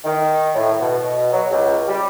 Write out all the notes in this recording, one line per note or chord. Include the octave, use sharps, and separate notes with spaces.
D#3
A2
B2
F#3
C#2
G3